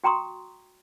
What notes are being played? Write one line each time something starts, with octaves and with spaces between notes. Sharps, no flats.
F#4 G5 A#5 C6 C#6 D#6